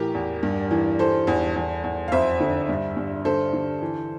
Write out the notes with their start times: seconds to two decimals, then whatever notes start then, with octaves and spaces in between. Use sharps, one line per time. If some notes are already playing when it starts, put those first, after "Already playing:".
Already playing: A2 E3 G4 A#4
0.14 E2
0.43 G2
0.71 E3
0.99 E3 A4 C5
1.27 E2
1.56 E2
1.84 E2
2.08 F5
2.12 F2 C5 E5
2.40 D3
2.69 G2
2.97 G2
3.25 D3 A4 C5
3.53 D3
3.82 E3